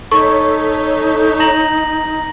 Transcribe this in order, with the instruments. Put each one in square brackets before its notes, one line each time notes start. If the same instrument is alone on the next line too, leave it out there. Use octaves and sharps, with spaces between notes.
[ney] D#4 [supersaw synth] A4 C#5 B6 [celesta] C#6
[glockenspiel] A#5 A#6 F#7